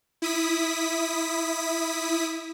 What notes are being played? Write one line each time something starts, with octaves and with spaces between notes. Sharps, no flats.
E4 D#6 B6